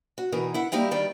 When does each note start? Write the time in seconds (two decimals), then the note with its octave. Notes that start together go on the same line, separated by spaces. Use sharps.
0.18 F#4
0.32 B2 E3 D#4 A#4
0.54 E4 F#5
0.72 G3 A#3 D#4 E4 G4
0.91 D#3 G3 G5